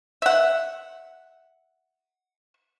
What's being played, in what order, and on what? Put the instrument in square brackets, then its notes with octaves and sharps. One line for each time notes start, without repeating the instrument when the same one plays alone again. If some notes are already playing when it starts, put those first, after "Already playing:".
[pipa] E5 F#5